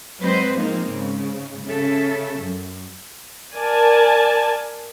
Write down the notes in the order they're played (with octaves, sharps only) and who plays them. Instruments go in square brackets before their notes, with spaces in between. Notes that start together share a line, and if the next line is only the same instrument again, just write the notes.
[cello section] F#3 G#3 C4 B4 C5 D#5
A2 F3 G#3 A#3 C4 D#4
G#2 C#3
C#3 C#4 A4 E5
F#2
[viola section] A#4 D5 G#5 A5